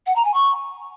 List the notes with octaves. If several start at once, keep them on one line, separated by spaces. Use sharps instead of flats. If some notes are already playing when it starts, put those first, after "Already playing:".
F#5
A#5
G#5
C#6